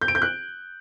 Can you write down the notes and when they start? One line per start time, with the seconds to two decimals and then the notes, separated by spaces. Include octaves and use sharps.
0.01 G6
0.08 D7
0.15 G6
0.22 F#6